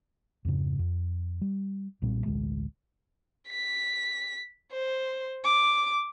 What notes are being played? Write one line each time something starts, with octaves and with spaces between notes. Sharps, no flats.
F2 G#2 C#3
F2
G3
B1 A#2 G3 C4
A1 D2 B2 G#3
B6
C5
D6